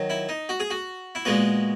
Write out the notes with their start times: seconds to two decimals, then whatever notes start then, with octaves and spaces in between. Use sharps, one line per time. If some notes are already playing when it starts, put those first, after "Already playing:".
Already playing: D#3 F#3
0.10 E4
0.29 D#4
0.49 F#4
0.60 G#4
0.70 F#4
1.15 E4
1.25 A#2 G#3 B3 F#4